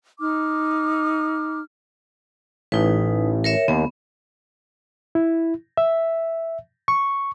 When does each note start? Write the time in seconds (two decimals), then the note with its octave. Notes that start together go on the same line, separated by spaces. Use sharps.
0.20 D#4 D6 F6
2.72 A1 D#4 B4
3.44 A#4 C#5 E5
3.68 D#2 B3
5.15 E4
5.77 E5
6.88 C#6